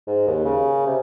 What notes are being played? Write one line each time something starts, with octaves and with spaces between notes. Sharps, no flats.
G#2
D#2
C#3
C3